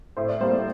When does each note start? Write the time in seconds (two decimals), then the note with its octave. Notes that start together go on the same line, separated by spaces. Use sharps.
0.17 A2 C5
0.28 D5
0.40 G3 A#3 C5
0.53 D5